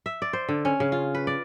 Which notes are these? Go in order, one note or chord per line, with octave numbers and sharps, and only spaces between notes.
E5
D5
C5
D3
C#4
C#3
F4
B4
D5